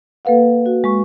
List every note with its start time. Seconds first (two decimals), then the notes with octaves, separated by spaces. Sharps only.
0.25 A#3 A4 B4 F5 F#5
0.66 F#4
0.84 G#3 C#6